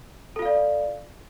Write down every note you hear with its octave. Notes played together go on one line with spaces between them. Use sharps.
F4 A4 D5 F5